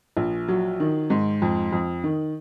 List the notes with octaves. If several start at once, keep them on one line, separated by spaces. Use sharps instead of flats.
A#1
F#3
D#3
G#2
F2
F2
D#3